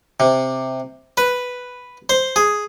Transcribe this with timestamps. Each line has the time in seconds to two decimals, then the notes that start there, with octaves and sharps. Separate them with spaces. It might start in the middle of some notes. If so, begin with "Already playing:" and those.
0.20 C3
1.17 B4
2.09 C5
2.36 G#4